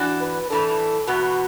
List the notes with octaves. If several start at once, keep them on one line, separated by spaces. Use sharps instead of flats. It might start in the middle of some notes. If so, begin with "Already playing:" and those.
Already playing: E3 D4 F#4
B4
A2 E3 D4 A4
E2 B2 B3 F#4